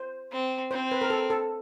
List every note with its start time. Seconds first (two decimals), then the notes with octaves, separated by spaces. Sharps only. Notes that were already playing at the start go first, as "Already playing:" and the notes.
Already playing: C5
0.32 C4
0.71 C4 C5
0.92 B4
1.01 A#4
1.10 A4
1.30 A4